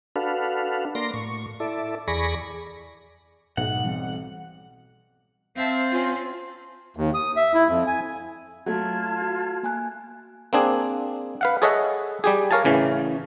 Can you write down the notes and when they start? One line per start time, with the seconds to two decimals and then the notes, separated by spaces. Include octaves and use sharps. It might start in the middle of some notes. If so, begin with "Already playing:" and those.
0.16 D4 F#4 A4 B4 F5
0.95 A#3 D5 C6 A#6
1.14 A2 C#6
1.60 E4 A4 D5
2.08 E2 G#4 D5 B5 C#6 A#6
3.57 B1 G#2 F#5
3.84 E3 G3 C4
5.57 C4 C5 E5 F5 A5
5.91 C#4 F4
6.97 D#2
7.14 D#6
7.36 E5
7.54 E4
7.68 F2
7.87 G#5
8.66 F#3 A3 F4 A5 G#6
9.22 F#4
9.63 A#3 G#5 F#6
10.53 A#3 C4 D4 G#4
11.41 B4 F5 F#5
11.62 G#4 A4 C#5 D#5 E5 F#5
12.24 G3 G4 G#4
12.51 A#4 C#5 F5 G#5 A5
12.65 A1 C#3 E3